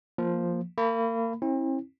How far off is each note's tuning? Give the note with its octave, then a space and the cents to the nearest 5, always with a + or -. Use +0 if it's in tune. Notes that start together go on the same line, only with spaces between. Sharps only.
F3 +0 A#3 +0
A#3 -35 B5 +0
C4 +40 E4 -25